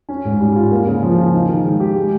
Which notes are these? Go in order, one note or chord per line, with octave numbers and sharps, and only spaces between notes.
C#4
G#2
G3
F4
A#3
C#3
F3
F4
D#4
D#3
G#3
G4
G#3